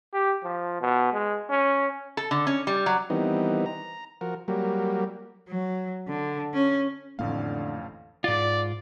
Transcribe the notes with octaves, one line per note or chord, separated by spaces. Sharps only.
G4
F3
B2
G#3
C#4
A4
D3
C#4
G3
F#3
D#3 E3 G3 B3 C4 D#4
A#5
F3 F#4 A#4
F#3 G3 A#3
F#3
D3
C#4
A1 F2 A2 D3 A3 A#3 F5
G#2 F4 D5